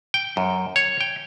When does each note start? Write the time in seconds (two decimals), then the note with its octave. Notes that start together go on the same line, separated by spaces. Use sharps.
0.14 G5
0.37 F#2
0.76 C#5
1.01 G5